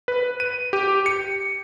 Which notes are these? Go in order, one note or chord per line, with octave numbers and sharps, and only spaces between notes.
B4
D#7
G4
C#7